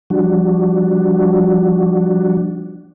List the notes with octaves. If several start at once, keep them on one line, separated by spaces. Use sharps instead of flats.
F3 G3 D4 F#4